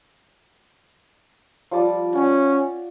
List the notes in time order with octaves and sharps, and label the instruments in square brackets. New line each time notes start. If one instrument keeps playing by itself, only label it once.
[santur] F3 G3 D5
[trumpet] C#4 [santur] F#5